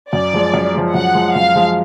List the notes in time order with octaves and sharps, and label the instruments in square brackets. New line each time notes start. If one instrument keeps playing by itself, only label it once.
[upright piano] F#2 [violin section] D5
[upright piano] F3 G#3
F#2
F3 G#3
[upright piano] F#2 [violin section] F#5
[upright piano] F3 G#3
[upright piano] F#2 [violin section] F5
[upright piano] F3 G#3